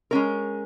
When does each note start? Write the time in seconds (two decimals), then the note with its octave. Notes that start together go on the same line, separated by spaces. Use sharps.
0.11 G#3 C#4 A#4